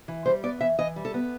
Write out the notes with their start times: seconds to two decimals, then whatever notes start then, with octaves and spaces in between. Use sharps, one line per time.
0.08 E3
0.25 G3 C5
0.43 B3 D5
0.61 E3 E5
0.79 E3 D#5
0.96 G3
1.05 A4
1.14 B3